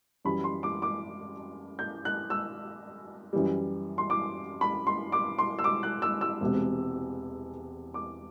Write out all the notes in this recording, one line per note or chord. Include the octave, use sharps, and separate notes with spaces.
F#2 E3 G3 B5
C6
D6
D6
G6
F#6
E6
F#2 E3 G3
C6
D6
B5
C6
D6
C6
E6
D6
F#6
E6
E6
E1 E2 C3
D6